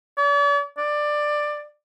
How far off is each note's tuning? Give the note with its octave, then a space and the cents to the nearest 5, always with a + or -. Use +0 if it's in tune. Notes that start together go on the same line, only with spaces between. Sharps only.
D5 -45
D5 +15